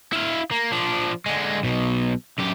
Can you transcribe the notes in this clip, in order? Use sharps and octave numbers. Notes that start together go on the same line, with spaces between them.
E4 F5
A#3
F3 D4
D3 G#3
B1 B2
F#2 G4